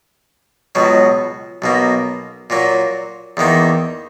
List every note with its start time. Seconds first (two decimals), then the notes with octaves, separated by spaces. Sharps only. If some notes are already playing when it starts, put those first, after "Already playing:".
0.75 C#2 B2 F#3
1.62 B1 B2 A#3
2.50 A#2 F#3 A#3
3.37 E2 D#3 A#3